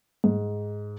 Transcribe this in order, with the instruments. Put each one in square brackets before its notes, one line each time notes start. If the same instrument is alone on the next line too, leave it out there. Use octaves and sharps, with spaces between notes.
[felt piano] G#2